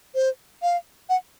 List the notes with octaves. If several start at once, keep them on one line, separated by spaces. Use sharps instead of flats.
C5
F5
F#5